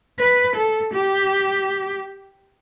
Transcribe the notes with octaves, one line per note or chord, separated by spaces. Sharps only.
B4
A4
G4